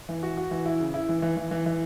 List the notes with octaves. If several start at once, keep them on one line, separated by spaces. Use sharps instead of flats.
E3
F#4
F#4
E3
E4
C#3
E4
E3
E3
E3
E3
E3